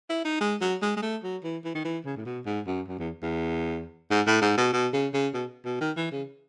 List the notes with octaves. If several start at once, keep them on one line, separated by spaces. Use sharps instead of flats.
E4
D#4
G#3
F#3
G#3
G#3
A3
F#3
E3
E3
D#3
E3
C#3
A2
B2
G#2
F#2
F#2
E2
E2
G#2
A2
G#2
B2
B2
C#3
C#3
B2
B2
D#3
E3
C#3